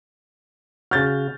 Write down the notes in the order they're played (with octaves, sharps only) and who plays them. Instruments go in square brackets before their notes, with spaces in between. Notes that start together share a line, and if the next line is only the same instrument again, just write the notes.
[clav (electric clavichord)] C#3 F#4 [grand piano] F6 G6 A6